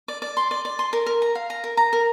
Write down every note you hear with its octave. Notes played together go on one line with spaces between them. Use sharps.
D5
D5
C6
D5
D5
C6
A#4
A#4
A#5
F5
A#5
A#4
A#5
A#4